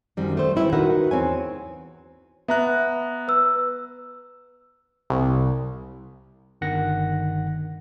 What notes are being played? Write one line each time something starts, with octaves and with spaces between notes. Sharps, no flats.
F#2 D#3 G3 C4
A3 C5
D#3 G3 C#4 E4 B4
D#4 F#4 A#4 B4 F#5
E2 C4 C#5 G#5
B3 E5 A#5 F#6
B4 E6
C2
G1 D#3 F#5 A#6